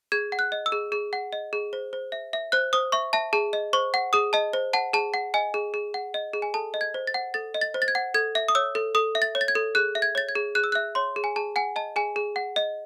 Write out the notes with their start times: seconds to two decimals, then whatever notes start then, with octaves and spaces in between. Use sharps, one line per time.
0.12 G#4 G#6
0.32 F#5
0.39 F#6
0.52 D#5
0.66 E6
0.72 G#4
0.92 G#4
1.13 F#5
1.33 D#5
1.53 G#4
1.73 C5
1.93 C5
2.12 E5
2.33 E5
2.52 C5 F#6
2.73 C5 D#6
2.92 E5 C#6
3.13 E5 A5
3.33 G#4 A5
3.53 D#5
3.73 C5 C#6
3.94 F#5
4.13 G#4 D#6
4.33 D#5 A5
4.53 C5
4.73 F#5 A5
4.93 G#4 A5
5.14 F#5
5.34 D#5 G#5
5.54 G#4
5.74 G#4
5.94 F#5
6.14 D#5
6.33 G#4
6.42 G#5
6.54 A4 A5
6.74 D#5
6.81 G#6
6.94 C5
7.07 A6
7.14 F#5
7.34 A4 A6
7.54 D#5
7.61 A6
7.74 C5
7.82 A6
7.88 G#6
7.95 F#5
8.14 A4 G#6
8.35 E5
8.48 D#6
8.55 C#5 E6
8.75 A4
8.95 A4 D#6
9.15 E5
9.22 A6
9.35 C#5
9.41 A6
9.48 G#6
9.55 A4
9.75 G#4 F#6
9.95 E5
10.02 G#6
10.15 C#5 A6
10.29 G#6
10.35 G#4
10.55 G#4 F#6
10.64 E6
10.72 E5 F#6
10.95 C#5 C6
11.16 G#4
11.24 G#5
11.36 G#4 A5
11.56 F#5 G#5
11.76 D#5 A5
11.96 G#4 G#5
12.16 G#4
12.36 F#5
12.56 D#5